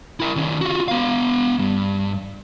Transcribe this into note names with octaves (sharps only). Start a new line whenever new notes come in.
E4 A#4
D#3 C#4
F4 F#4
B3 F5
G2